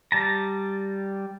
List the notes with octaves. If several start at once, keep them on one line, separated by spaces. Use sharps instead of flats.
G3 A5 A#5